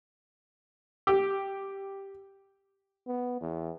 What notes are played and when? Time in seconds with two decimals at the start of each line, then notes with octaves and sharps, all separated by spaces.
1.07 G4
3.07 B3
3.41 E2